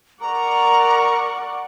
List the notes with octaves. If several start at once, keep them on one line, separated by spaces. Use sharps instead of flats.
A#4 D5 F#5 A#5 C#6